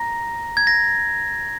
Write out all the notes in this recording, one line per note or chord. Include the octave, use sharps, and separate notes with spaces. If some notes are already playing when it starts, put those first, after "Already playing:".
Already playing: A#5 A#6
G#6
A#6